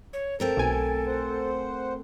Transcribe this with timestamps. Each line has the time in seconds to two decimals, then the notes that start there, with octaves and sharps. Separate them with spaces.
0.13 C#5
0.40 A3 C4 A4 A#4
0.57 B1 G#5
1.07 C5 F#5